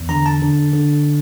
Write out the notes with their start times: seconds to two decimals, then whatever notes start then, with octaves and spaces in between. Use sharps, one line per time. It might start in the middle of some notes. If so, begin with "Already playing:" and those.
Already playing: E2
0.09 D3 A#5
0.26 A5
0.42 D3
0.73 D3